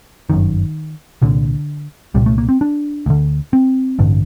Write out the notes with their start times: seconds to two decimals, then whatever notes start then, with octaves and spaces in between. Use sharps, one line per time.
0.30 G1 F#2 D3 D#3
1.22 C2 A#2 D3
2.14 C2 A#2 G3
2.26 A3
2.38 A#3
2.49 C4
2.61 D4
3.06 D2 D3
3.53 C4
3.99 A1 G2 D3